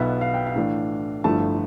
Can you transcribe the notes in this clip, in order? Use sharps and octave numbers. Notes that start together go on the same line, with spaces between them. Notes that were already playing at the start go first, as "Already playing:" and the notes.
Already playing: B1 B2 B3 F4 E5
F5
G5
F5
A2 E3 A3 D4
G1 G2 F3 A3 E4 A5